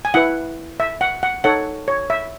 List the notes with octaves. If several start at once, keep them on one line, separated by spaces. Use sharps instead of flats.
G#5
E4 B4 F#5
E5
F#5
F#5
D#4 A4 C#5 F#5
C#5
E5